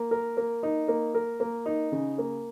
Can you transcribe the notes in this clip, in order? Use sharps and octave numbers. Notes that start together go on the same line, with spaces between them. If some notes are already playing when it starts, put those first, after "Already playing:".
Already playing: A#3
A#4
A#3
D#4
A#3
A#4
A#3
D#4
C#3
A#3